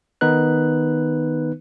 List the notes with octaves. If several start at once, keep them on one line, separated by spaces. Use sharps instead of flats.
D#3 B3 D#4 B4 F#6